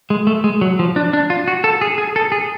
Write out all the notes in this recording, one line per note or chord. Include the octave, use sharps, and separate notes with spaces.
G#3
A3
G#3
F#3
F3
D4
D4
F4
F#4
A4
G#4
G#4
A4
G#4